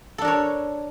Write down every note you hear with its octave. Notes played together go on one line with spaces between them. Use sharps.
D4 A4 A#4 C#5